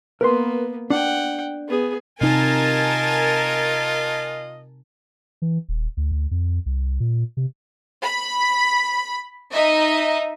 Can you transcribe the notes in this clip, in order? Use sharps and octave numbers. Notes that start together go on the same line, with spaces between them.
A#3 B3 A#4 B4 C6
D4 F#5 G5
B3 G#4
C3 D#4 F4 A#4 D#5 G#5 A5
E3
D#1
D2
D2
F2
C2
A#2
C3
B5
D#4 D#5 E5